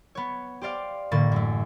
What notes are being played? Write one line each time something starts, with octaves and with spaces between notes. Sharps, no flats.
B3 C#5
G4 C5 D5 F5
A1 A2 D3 A#3 C#6 A6
F#2 A3